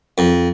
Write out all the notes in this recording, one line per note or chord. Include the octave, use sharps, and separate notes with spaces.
F2